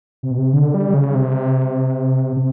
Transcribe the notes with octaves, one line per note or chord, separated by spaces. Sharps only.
C3
B2
C3
D3
G3
C#3
C3
C3